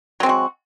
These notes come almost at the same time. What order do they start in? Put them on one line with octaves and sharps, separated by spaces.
F#3 C4 G#3 F#4